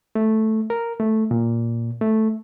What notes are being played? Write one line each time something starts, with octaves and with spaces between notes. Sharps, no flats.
A3
A#4
A3
A#2
A3